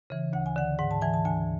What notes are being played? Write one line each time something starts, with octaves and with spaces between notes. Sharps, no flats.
C#3 E3
D2 F#5
G#5
D3 F#5
G#2 F#5
A5
E3 G#5
A5
D2 G#5